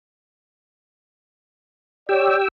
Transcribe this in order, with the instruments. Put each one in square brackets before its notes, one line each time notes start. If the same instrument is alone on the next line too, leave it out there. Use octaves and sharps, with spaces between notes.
[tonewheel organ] G4 G5 E6 [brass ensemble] C#5 D5